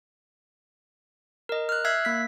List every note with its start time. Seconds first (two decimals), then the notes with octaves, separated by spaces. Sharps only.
1.49 A#4 D#5
1.69 F6 F#6
1.85 E5 E6 F#6 G#6 C7
2.05 A#3 B6